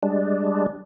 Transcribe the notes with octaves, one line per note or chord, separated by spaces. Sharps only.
G3 G#3 D4